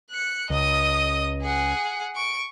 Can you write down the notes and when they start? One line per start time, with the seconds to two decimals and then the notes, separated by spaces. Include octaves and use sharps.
0.11 F#6 C#7
0.50 C#2 D#5 D#6
1.42 G#4 F#5
2.15 C#6 D7